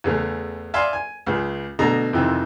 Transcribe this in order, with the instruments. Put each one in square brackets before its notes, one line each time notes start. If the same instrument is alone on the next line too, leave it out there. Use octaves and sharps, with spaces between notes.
[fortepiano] E2 C#3 A3
D5 E5 F5 G#5 B5 C6
G#5
C#2 C#3
B2 D3 A3 A#5 D#6
F2 C3 D#3 E3